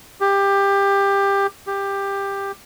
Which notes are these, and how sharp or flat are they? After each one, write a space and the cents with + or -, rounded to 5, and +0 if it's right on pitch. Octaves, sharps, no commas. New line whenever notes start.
G4 +20
G4 +15